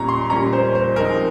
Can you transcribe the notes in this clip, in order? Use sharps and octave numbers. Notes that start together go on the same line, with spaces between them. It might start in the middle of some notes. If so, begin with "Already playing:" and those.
Already playing: A#2 G3 C#4 A#5
C6
A#2 G3 C#4 A#5
C5
C5
F3 G#3 C4 D#4 A#4